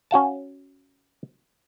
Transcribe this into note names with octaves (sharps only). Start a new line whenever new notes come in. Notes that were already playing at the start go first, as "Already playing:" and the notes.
C#4 F#4 F5 A5